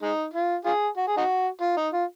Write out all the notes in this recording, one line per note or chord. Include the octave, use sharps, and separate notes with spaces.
G#3 D#4
F4
F4 G#4
F#4
G#4
D#4 F#4
F4
D#4
F4